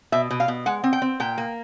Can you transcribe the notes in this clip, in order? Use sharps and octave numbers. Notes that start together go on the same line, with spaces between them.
B2 E5
B2
F5
B2
G#3 F#5
C4
G5
C4
A#2 G5
A#3